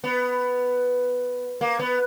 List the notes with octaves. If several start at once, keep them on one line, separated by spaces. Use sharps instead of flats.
B3
A#3
B3